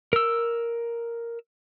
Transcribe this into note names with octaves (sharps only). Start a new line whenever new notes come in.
A#4 E6